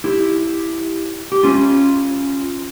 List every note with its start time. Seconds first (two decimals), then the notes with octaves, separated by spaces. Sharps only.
0.04 E4 G4
1.32 G4
1.43 C#4 F4